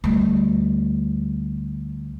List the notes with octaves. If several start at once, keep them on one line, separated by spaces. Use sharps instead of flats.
D2 G3